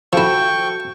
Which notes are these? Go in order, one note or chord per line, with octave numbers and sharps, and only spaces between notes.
F3 E4 F#4 A4 G5 C#6